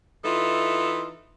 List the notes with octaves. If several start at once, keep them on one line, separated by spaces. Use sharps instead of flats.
E3 D#4 F4 A4 E5